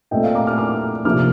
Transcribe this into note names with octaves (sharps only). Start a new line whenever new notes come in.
A#2 A3 C4 D#5 G5
D5 F5
A#5 D6
D6 F6
D6 F6
C3 F3 A#3 D6 F6